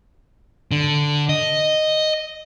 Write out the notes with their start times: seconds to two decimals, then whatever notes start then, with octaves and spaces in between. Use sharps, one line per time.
0.71 D3
1.29 D#5